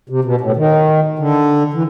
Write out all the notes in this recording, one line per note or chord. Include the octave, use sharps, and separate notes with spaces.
C3
B2
A2
D#3
D3
E3